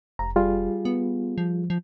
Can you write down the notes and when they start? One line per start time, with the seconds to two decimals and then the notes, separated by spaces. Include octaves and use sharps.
0.19 F1 A#5
0.36 G3 F4 G#4
0.85 B3
1.38 F3
1.70 F3